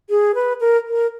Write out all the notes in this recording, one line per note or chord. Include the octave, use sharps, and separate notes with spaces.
G#4
B4
A#4
A#4